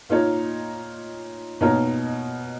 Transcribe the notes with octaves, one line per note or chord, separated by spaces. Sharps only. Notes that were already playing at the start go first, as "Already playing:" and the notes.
A#2 A#3 D#4 A#4 C#5
B2 A#3 D#4 A#4 C#5